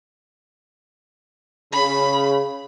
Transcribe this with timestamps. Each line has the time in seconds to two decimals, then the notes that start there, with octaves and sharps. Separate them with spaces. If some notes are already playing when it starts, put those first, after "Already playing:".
1.73 C#3 B5